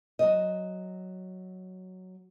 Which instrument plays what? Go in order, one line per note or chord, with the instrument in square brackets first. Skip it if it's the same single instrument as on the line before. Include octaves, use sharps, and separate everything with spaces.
[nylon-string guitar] F#3 D#5